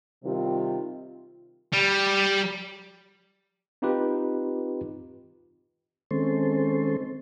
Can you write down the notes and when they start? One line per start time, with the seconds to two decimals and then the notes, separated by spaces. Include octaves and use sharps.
0.24 C3 D#3 G3 C4 F4
1.73 G3
3.82 C4 D#4 F4 G4 B4
6.11 D#3 G#3 C4 C#4 A4 C5